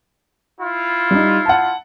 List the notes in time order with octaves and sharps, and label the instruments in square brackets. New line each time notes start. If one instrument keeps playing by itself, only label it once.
[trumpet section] E4 F4
[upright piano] G3 D#4
F#5 A5